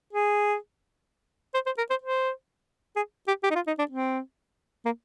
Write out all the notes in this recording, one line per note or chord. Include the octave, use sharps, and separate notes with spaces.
G#4
C5
C5
A#4
C5
C5
G#4
G4
G4
D#4
F4
D#4
D4
C4
A#3